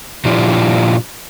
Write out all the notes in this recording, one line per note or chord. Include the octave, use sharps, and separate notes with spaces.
A#2 F3 D4 E4 F4 G4